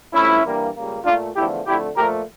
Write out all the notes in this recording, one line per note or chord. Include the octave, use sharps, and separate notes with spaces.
G2 F3 A3 C#4 E4
G2 E3 G3 A#3
C#2 C#3 G3 A#3
A#2 A3 D4 F4
E2 D3 F3 A3 E4 G4
F2 D3 A3 E4 G4
A#2 F3 A3 G4 A#4